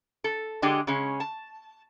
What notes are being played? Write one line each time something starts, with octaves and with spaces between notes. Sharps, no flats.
A4
D3 G#3 D4 G4 G#4 D#5
C#3 G#3 C#4
A5